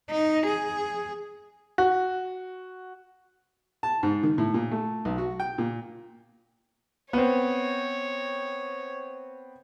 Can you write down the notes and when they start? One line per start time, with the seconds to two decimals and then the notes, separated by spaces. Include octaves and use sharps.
0.10 D#4
0.47 G#4
1.78 F#4
3.83 A5
4.03 G#2
4.23 D#3
4.38 A2
4.54 A#2
4.71 A3
5.05 B1
5.18 F#4
5.40 G5
5.58 A#2
7.13 B3 C4 C#5